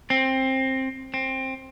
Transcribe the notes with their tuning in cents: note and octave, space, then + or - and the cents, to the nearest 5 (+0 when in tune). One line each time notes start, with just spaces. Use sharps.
C4 +15
C4 +15